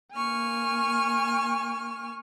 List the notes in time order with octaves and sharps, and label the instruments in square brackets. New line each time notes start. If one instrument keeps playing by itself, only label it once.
[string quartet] A#3 G#5 C#6 F6